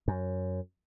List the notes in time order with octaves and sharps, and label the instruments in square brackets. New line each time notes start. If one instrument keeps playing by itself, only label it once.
[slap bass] F#2